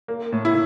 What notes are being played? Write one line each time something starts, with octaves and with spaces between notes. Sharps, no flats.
A#3
A2
E4